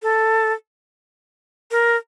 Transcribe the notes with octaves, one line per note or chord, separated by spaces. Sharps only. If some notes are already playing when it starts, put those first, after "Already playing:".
A4
A#4